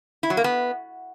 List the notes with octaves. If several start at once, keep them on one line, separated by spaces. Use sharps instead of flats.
E4
F#3
A#3
B3